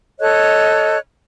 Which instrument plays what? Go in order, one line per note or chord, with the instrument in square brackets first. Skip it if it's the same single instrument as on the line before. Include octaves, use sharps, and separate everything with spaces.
[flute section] A4 C#5 D#5 F#6